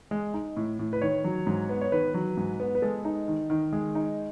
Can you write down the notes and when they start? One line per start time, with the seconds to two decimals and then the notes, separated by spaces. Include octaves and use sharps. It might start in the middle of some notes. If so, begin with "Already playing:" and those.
0.11 G#3
0.34 D#4
0.57 A2
0.79 A2
0.93 B4
1.01 D#3 C#5
1.24 F#3
1.47 G#2
1.69 B3
1.81 C#5
1.92 D#3 B4
2.14 F#3
2.37 G#2
2.60 B3
2.75 B4
2.82 G#3 A4
3.05 D#4
3.28 D#3
3.50 D#3
3.73 G#3 G#4
3.95 D#4